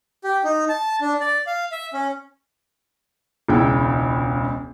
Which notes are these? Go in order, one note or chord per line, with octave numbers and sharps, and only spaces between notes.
G4
D#4
A5
D4
D5
F5
E5
C#4
E1 C#2 E4 G5